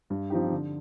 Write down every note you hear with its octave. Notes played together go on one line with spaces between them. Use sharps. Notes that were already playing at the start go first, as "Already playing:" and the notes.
G2
F3 C4 D#4 G4
D3